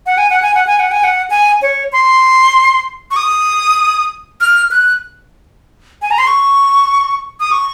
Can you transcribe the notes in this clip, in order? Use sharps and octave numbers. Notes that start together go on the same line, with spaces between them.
F#5
G#5
F#5
G#5
F#5
G#5
F#5
G#5
F#5
G#5
C#5
C6
C#6
D#6
F6
F#6
G#5
A#5
C6
C#6
D#6
C#6